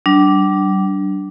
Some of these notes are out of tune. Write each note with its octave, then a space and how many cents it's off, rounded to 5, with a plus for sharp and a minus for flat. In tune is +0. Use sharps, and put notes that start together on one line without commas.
G3 -40 D4 +0